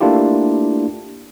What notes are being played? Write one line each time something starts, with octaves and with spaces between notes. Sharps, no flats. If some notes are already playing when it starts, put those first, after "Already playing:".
A3 A#3 D4 E4 F4 G4